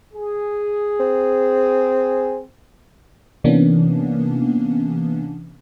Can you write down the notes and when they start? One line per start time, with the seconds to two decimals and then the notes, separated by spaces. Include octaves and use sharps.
0.14 G#4
1.00 C4
3.44 C3 E3 A#3 B3 C#4 D4